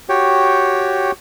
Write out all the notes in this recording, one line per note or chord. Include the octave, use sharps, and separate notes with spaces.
F#4 G4 C#5 G5